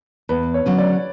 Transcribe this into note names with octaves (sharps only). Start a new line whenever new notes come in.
E2 B4
C#5
D3 F#3 C#4
D5